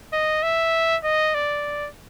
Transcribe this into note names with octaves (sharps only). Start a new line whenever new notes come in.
D#5
E5
D#5
D5